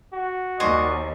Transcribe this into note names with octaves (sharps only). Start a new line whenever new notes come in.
F#4
D#2 A#4 C5 D5 D#5 G#5 C#6